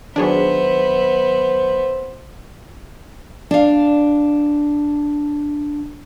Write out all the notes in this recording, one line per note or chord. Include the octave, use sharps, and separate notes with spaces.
D#3 F#3 B3 D4 G#4 C5 C#5 E5
D4 F5